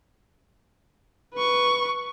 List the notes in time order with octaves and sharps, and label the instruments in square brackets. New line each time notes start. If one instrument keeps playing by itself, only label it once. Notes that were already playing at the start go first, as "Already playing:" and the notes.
[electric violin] B4 C#6